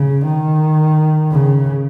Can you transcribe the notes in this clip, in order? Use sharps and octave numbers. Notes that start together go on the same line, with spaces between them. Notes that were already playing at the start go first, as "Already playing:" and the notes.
Already playing: C#3
D#3
C#3